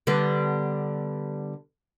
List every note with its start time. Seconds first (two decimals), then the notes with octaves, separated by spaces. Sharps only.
0.07 D3 G3 B3